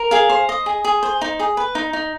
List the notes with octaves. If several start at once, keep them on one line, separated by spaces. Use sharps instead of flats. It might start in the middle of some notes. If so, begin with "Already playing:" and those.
Already playing: A#4
G#4 F5
C5
D#5
G#4
G#4
C5
D#4
G#4
B4
D#4
D#4